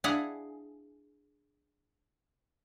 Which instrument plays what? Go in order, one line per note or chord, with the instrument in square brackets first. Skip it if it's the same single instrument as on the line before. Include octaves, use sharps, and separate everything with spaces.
[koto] D4 E4 G#4 F5 F#5